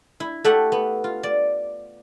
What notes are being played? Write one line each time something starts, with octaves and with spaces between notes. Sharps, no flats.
E4
A3 G4 A4 E5 F#5
B3
F4
D5